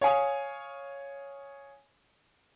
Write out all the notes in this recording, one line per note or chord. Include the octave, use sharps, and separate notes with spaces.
C#5 F5 G#5 D#6